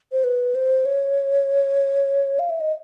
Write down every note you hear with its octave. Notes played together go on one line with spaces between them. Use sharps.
C5
B4
C5
C#5
F5
E5
D#5